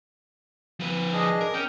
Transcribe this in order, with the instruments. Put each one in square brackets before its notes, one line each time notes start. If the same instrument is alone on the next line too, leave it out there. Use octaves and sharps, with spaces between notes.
[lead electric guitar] F3 B4
[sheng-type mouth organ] D4 G#4 D#5
[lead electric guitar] A#4
[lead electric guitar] C#4 [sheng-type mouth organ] G5